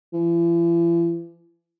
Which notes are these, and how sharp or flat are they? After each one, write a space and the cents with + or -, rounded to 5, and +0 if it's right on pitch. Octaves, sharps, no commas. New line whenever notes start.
E3 +45